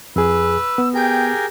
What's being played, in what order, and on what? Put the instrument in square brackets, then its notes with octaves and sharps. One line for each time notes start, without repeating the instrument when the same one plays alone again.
[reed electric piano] F2 G#4 [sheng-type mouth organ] B4 [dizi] E6
[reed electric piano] B3
[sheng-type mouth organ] G4 G#4 A#4 [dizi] G5